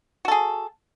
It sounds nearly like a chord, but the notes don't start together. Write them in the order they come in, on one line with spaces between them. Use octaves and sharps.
F#4 A4 G#4